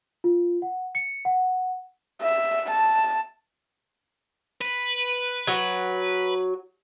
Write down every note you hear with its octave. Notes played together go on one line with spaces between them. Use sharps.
F4
F#5
C#7
F#5
E5
A5
B4
F#3